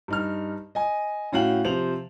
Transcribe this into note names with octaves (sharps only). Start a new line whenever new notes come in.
G2 D#4 F6
D#5 G#5
A2 C#4 F#4 F5 G5 F#7
C3 F3 C5 F7 F#7